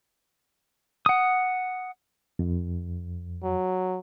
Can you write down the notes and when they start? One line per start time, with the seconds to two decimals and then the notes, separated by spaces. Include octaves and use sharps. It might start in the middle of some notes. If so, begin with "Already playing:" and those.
1.06 F#5 D#6
2.39 F2
3.43 F#3